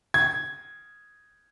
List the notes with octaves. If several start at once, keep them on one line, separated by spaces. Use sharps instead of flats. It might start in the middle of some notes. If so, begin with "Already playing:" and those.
G#6